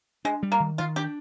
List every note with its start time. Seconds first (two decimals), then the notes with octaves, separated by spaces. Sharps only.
0.25 G#3 D4
0.43 G3
0.52 A#3
0.60 D#3
0.78 D#3 F4
0.96 D4 G4